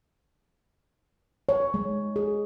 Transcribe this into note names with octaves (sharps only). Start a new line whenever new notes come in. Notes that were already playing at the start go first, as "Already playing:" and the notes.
C#5
G#3
G#4